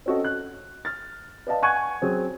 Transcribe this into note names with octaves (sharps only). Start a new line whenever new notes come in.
C4 C#4 F#4 A4 D#5
F#6
F6 A6
B4 D5 D#5 F5 A5
F#5 G#5 C#6 F#6 G#6 D#7
F#3 C4 G#4